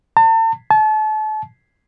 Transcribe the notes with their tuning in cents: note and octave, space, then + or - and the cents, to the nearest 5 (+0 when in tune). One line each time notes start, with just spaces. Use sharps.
A5 +40
A5 -35